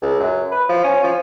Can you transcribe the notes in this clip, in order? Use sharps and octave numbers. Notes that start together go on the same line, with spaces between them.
C#2
F#2
B4
F3
C#4
F3